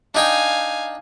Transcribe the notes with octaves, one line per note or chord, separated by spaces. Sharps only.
D4 D#4 F5 G5 G#5